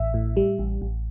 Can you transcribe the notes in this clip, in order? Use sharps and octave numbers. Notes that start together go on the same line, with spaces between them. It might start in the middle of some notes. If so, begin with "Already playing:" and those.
Already playing: A1 E5
A2
G3
A1
A1